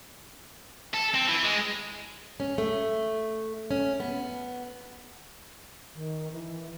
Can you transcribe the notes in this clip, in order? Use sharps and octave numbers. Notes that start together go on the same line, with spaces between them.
A4
C4
E3
G#3
C#4
A3
C#4
B3
D#3
E3